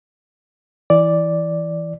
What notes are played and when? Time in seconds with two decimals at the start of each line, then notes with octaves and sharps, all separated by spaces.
0.90 E3 D5